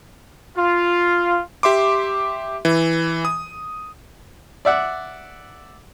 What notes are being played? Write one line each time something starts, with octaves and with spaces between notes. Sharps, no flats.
F4
G4 E5 C6 D6
E3
D#6
D5 E5 F#5